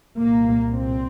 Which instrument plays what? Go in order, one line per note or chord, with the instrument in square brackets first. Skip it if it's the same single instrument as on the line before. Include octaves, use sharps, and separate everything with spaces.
[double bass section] C2 A#2 A#3
C4